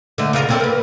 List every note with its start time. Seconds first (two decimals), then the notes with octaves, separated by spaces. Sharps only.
0.18 D3 A3
0.33 C#3 F4 A#4
0.49 A#3 C4 A4
0.60 A#4 B4